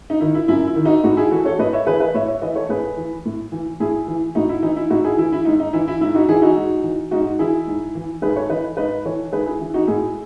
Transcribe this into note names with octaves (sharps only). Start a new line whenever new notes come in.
D#4
D#3 E4
E4
F#2 E4
E4
D#3
D#4 F#4
A2 D#4 F#4
E4 G#4
E3 F#4 A4
A4 C#5
A2 B4 D#5
C#5 E5
E3 G#4 B4
B4 D#5
A2 C#5 E5
C#5 E5
E3 B4 D#5
A4 C#5
A2 G#4 B4
E3
A2
E3
A2 E4 G#4
E3
A2 D#4 F#4
E4
E3 D#4
E4
A2 D#4 F#4
E4 G#4
E3 E4
E4
G#2 D#4
D#4
E3 E4
E4
G#2 E4
D#4 F#4
E3 E4 G#4
D#4 F#4
G#2
E3
G#2 D#4 F#4
E3 E4 G#4
G#2
E3
G#2 G#4 B4
A4 C#5
E3 B4 D#5
G#2 B4 D#5
E3 A4 C#5
G#2 G#4 B4
E4 G#4
E3 E4
D#4 F#4
A2 E4 G#4